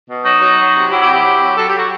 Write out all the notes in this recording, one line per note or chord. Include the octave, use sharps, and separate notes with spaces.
B2
F#3 D#4 F#4
F#3
F#3
C3
F#3 E4 G4
E4 G4
C3
E4 G4
F#3
F#3
F#3 A4
F#3 G4
F#4